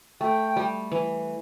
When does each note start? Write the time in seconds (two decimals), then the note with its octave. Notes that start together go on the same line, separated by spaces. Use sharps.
0.21 A3 G5
0.56 G3
0.92 E3